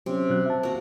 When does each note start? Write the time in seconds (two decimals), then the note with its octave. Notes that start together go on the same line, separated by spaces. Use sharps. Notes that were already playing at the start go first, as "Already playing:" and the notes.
0.06 C3 F#3 C#4
0.29 B2 F#3 F#6
0.46 E5 A5
0.63 A#3 F#4